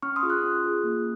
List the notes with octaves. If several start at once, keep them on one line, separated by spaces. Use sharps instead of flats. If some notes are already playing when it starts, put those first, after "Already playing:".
C#4 C#6 F6
C6 D#6
F4 G#4
D#6 F#6
C#4
F4 G#4
A#3